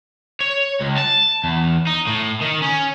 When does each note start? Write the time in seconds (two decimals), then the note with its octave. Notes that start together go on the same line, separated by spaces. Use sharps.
0.41 C#5
0.81 C#2
0.97 A5
1.44 E2
1.87 D#4
2.07 A2
2.41 D#3
2.62 C#4